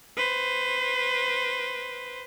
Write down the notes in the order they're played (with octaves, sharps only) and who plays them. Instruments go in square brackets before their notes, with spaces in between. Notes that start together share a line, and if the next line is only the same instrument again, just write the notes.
[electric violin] B4 C5